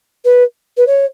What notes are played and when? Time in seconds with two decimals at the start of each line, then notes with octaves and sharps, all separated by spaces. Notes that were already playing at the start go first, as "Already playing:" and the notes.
0.24 B4
0.77 B4
0.87 C#5